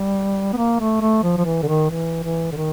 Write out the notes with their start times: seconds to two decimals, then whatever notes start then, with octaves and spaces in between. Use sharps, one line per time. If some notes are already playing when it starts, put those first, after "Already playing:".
Already playing: G3
0.53 B3
0.57 A#3
0.80 A3
1.01 A3
1.23 F3
1.38 F3
1.45 E3
1.63 D3
1.68 D#3
1.90 E3
2.23 E3
2.52 D3
2.56 D#3